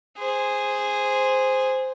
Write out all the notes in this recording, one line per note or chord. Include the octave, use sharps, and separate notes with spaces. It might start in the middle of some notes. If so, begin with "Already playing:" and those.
G#4 C5